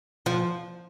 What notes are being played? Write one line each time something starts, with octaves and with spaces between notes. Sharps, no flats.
F3